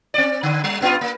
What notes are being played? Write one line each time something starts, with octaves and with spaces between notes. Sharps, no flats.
C4 D5
D3
G3
G2 B3 F4
A#3